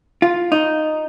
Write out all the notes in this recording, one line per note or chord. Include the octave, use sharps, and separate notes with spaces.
F4
D#4